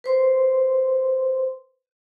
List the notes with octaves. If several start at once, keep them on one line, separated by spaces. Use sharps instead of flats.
B4 C5 C6